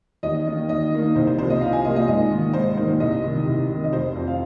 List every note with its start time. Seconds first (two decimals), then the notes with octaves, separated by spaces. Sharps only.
0.23 D#2 D#5
0.46 D#3 A#3 D#4 D#5
0.69 D#2 D#5
0.93 D#3 A#3 D#4
1.15 C2 C5
1.27 C5
1.38 C3 F3 A#3 C5
1.50 D#5
1.61 C2 F5
1.73 G#5
1.84 C3 F3 A#3 D#5
1.96 D#5
2.08 G#2 D#5
2.31 D#3 A#3
2.54 G#2 C5
2.77 D#3 A#3 C5
3.00 C2 D#5
3.23 C3 D#3
3.46 C2
3.69 C3 D#3
3.84 D#5
3.93 F1 C5
4.15 F2 F3 C4
4.27 F5